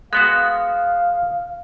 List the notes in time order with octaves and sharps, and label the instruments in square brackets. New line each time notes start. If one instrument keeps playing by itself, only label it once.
[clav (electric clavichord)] G#3 B3 F#4 [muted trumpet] F5 [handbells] F#6